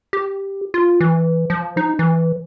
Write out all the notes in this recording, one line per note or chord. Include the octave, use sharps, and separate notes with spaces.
G4
F4
E3
F3
D#4
E3